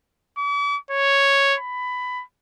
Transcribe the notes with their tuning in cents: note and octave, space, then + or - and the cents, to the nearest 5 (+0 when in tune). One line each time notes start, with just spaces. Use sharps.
D6 -45
C#5 +0
B5 +15